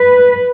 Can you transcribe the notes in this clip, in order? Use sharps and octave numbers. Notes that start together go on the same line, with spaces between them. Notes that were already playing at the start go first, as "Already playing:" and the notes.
Already playing: B4